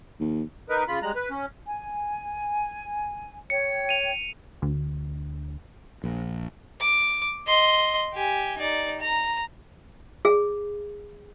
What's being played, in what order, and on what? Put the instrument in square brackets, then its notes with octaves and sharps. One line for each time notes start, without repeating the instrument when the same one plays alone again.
[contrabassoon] D#2
[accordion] D#4 A#4 B4
C#3 F4 B5
G3 G#3 A#5 F#6
B4
C#4
[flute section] G#5
[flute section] C#5 G5 [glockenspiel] C#7
[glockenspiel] D#7 F7
[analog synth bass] D2
[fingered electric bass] A#1
[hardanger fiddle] D6
D#5 C6
G4 G#5
D#4 D5
A#5
[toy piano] G#4